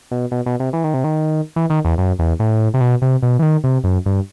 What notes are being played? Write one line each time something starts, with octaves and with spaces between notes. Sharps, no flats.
B2
B2
B2
C3
E3
D#3
C3
D#3
E3
D#3
E2
F#2
E2
A2
C3
B2
C3
B2
E3
D#3
C3
F#2
G2